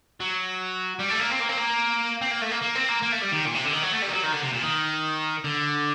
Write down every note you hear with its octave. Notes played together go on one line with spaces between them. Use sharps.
F#3
G3
A3
A#3
C4
A#3
C4
A#3
C4
A#3
A3
A#3
A#3
C4
A#3
A#3
A3
G3
D#3
A#2
C3
D3
D#3
F#3
A3
G3
D#3
F#3
D#3
D3
C3
A#2
D#3
D3